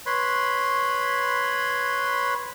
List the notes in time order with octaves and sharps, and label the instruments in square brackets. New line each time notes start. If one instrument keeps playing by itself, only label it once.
[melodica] B4 C#5 B5 C6